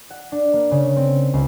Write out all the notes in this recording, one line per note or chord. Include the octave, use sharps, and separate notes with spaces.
F#5
D4
A#3
C#3
C4
C#2